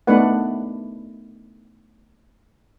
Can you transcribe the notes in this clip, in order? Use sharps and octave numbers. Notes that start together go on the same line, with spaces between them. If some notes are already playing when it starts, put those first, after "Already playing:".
A3 B3 D4 D#4 B4 F#5